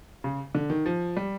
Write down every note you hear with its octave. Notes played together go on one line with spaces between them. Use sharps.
C#3
D3
D#3
F3
G3